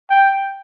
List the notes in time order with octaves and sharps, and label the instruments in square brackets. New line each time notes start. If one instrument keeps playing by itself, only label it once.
[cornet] G5